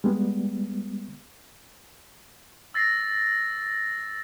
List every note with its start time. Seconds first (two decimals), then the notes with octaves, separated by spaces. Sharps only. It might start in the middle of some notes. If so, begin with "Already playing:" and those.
0.04 G3 G#3 B3
2.74 E6 A6 A#6 C7